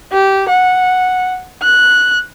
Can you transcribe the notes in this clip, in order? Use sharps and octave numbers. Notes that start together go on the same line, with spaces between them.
G4
F#5
F#6